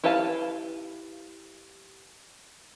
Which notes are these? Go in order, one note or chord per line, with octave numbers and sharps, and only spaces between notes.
E4 G4 B4 F5 A5